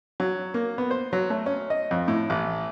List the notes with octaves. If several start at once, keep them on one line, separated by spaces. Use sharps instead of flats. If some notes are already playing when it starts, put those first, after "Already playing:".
F#3
A#3
B3
C5
F#3
A3
C#4
D#5
F2
A2
A1